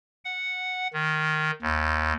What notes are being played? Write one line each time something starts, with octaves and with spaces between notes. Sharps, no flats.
F#5
D#3
D#2